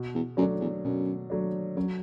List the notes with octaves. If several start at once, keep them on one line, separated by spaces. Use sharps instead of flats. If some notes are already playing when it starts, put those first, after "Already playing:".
Already playing: B2
E2
F#2 F#3 A3 D4
E2
F#2 B2
F#3 A3 D4
F#2 F#3